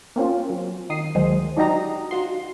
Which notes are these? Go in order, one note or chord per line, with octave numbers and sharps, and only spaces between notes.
A#3 C4 C#4 F4
F#3
D#3 D#6 C7
D2 D#3 F#3 G#3 C5
D4 D#4 F#4 G4 D#5 A#5
F4 F#4 C6